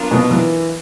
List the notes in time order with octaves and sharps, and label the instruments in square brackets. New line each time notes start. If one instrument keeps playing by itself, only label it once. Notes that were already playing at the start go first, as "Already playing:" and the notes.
Already playing: [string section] F#3 B3 D4 F4 A#4
[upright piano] B2
E3